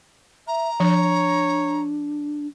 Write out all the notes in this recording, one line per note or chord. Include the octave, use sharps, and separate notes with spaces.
E5 A#5
F3 D4 C#5